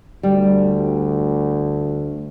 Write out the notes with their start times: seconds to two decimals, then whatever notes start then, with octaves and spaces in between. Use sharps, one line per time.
0.23 D2 G3